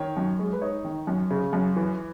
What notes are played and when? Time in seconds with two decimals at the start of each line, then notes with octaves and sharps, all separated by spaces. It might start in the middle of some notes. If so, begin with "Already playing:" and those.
Already playing: D#3 C#5
0.17 F#2
0.39 G#3
0.53 B4
0.61 D#4 C#5
0.84 D#3
1.07 F#2
1.30 C#3
1.53 F#2
1.76 E3